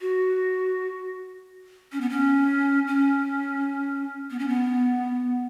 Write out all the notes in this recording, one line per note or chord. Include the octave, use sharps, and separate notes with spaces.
F#4
C#4
B3
C#4
C#4
B3
C#4
B3